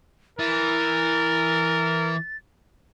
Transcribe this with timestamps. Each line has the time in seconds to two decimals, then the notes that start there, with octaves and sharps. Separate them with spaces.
0.39 E3 A#4 A6